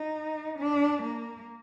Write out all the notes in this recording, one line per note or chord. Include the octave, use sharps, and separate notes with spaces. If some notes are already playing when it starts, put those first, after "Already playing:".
Already playing: D#4
D4
A#3